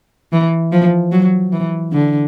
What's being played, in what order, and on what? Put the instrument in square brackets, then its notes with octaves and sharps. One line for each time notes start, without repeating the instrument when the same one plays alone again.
[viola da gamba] E3
F3
F#3
E3
D3